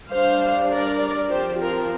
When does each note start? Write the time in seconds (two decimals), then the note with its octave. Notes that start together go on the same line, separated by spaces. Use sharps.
0.10 G3 D4 C5 F5
0.69 A#4 D5
1.29 F3 C4 G4 C5
1.59 F4 A#4